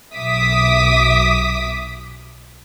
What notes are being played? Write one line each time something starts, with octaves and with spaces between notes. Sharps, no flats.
B1 E5 D6 D#6 B6